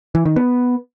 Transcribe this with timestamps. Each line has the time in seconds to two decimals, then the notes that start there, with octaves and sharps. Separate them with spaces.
0.15 E3
0.26 D#3
0.36 B3